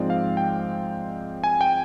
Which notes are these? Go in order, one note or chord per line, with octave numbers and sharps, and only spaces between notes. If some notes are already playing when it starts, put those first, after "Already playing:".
Already playing: G#2 F3 G#3 C4 D5
F5
G5
G#5
G5